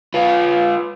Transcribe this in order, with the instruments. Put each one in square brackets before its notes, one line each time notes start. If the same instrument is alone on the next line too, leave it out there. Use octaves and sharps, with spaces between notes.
[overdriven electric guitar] F4 B4